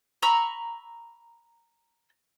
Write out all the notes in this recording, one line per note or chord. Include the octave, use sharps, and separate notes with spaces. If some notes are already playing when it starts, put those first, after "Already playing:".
A#5 B5 C#6 E6